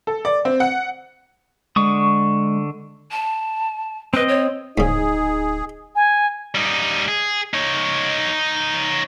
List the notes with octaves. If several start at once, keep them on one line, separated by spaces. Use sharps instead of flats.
A4
D5
C4
F#5
D3 G#3 C#6 D#6
A5
C4 B4 D#5
C#5
D1 G#2 C#3 D#4 G#4
G#5
G3 D#4
G#4
D#4 C#5